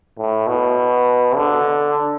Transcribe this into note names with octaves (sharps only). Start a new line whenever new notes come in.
A2
B2
D3